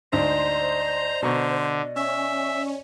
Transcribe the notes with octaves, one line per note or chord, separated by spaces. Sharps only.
D2 G#2 D4 C5 D5 D#5 A#5
B2 D3 A#5 C#6
C#4 E5